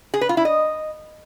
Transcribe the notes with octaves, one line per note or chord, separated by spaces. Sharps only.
G#4
B4
F4
E4
D#5